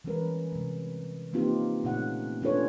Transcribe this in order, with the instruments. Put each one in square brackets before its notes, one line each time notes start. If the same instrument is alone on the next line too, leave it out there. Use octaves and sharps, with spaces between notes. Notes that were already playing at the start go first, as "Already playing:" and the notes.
[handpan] E3 G3 G#3 C#4 A#4 B4
C3 G#3
A#3 C4 D#4 F4 G4 B4
A#2 C#3 A3 C#4 D#4 F#5
C#4 D4 F4 A4 B4 C#5